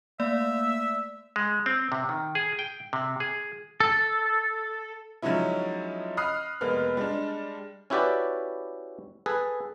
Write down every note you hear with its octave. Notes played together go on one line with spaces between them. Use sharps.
A3 A#3 D5 E5
G#3
C4
C3
D#3
G#4
G5
C3
G#4
A4
F3 F#3 G#3 C#4 D#4 E4
D#5 B5 D#6 F6 F#6 C7
F1 G#3 A#3 B3 F6
G3 G#3 D4
C#4 E4 F#4 G4 B4 D5
G#4 A4 B4